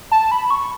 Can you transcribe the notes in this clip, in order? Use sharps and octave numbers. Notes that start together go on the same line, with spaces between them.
A5
B5
C#6